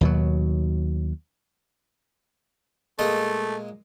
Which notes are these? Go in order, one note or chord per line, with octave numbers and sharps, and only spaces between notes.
D#2 B2 F#3
A#2 G#3 A3 D#5